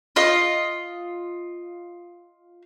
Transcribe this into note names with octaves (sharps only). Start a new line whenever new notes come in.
F4 D#5